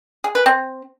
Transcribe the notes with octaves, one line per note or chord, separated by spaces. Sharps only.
G#4
B4
C4